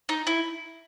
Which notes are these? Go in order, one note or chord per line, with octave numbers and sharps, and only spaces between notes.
D#4
E4